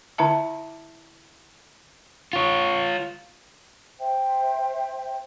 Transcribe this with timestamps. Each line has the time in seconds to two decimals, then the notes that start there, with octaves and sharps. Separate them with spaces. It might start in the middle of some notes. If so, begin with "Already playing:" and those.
0.18 D3 E4 E5 A5
2.33 F4 C#5
3.99 C5 E5 G5